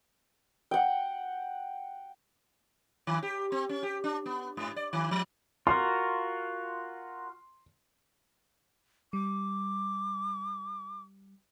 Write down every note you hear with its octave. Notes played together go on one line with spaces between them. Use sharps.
F#5 G5
D#3
G4
C4
C#4
G4
D4
B3
G#2
D5
D#3
F3
F4 F#4 A#4 C6
G3 D6